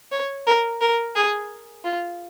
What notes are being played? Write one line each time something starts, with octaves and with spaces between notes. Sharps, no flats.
C#5
A#4
A#4
G#4
F4